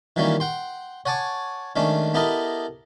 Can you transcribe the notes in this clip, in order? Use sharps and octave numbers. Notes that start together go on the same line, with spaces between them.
D#3 E3 F#3 G3 A#3 C#4
F#5 G5 C6
C#5 F#5 G#5 A5 C#6 D6
D#3 G#3 A3 C#4 D4
B3 E4 G4 A4 A#4 D#5